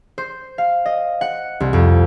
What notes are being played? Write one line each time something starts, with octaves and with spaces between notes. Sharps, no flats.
C5
F5
D#5
F#5
C2
F2